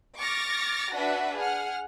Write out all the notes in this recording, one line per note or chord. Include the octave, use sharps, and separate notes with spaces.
C#6 D6 F6 A6 A#6
D4 F#4 B4 E5
G#4 F#5 F6